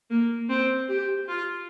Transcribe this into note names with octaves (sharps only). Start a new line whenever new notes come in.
A#3
C4
G4
F4